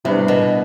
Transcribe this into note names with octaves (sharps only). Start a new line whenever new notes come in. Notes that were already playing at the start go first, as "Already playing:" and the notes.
A2 C3 G3 B3 D4
B2